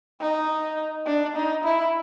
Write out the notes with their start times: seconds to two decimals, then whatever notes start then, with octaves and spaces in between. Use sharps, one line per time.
0.21 D#4
1.06 D4
1.36 D#4
1.64 E4